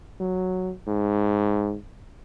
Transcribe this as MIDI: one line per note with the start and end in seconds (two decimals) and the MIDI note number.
0.20 0.73 54
0.87 1.76 44